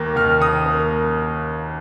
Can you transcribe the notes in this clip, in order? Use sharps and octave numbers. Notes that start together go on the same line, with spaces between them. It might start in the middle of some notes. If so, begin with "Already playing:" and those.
Already playing: D#2 A#3
D#2 F6
D#2 D#6
A#3